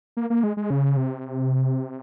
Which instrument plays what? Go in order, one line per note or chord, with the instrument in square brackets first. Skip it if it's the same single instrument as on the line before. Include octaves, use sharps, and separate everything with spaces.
[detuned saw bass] A#3
A#3
G#3
G#3
C#3
C3